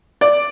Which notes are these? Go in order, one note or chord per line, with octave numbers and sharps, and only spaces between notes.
D5